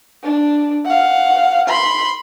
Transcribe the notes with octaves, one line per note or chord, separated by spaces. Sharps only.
D4
F5 F#5
B5 C6